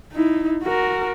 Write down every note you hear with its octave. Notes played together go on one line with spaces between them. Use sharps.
D#4 E4
F#4 A#4